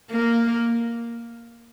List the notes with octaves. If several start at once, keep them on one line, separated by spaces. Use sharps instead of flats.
A#3